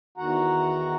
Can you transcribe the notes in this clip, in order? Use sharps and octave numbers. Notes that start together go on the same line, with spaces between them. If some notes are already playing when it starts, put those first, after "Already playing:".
E2 D#3 F#4 F#5 A#5